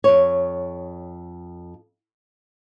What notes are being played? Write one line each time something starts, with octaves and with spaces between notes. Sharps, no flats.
F2 C#5